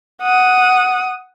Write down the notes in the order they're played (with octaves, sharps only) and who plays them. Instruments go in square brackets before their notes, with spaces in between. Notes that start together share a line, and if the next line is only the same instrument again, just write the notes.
[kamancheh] F#5 D#6